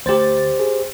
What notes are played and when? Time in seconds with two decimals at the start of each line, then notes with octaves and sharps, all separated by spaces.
0.06 D2 G4 C5 A6
0.59 G#4